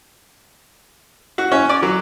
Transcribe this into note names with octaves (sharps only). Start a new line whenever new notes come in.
F#4
C#4
D5
F#3